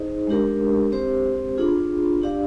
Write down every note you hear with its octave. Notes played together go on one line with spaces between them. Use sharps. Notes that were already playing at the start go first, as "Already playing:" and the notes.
Already playing: D#4 G#4 C5 D#5
G#3 D4 G4 A#4
C4 G4 C5
D4 F4 G#4
D4 G4 D5 F5